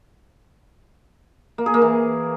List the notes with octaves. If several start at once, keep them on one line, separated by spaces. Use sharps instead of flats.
A#3
G#4
A#3
E3